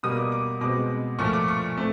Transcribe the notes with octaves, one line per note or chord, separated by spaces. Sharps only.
B2 G3 A#3 D#6
D6
D6
B2 G#3 C4 D6
A#2 F3 A3 C#6
D6
C#6
A3 C4